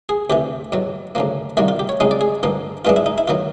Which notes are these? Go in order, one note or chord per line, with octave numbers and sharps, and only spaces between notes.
G#4
D2 C3 E3 G4
E2 B2 F#3
D2 C#3 F3 A#3
C2 C3 D#3 G3 A#3 F#4
F4
G4
C#5
C#3 F3 G#3 C4 D#4
D5
G#4
G2 D3 F3 A#3
G2 E3 G#3 B3 D4 F4
E4
D#4
E4
D#3 F#3 B3 F4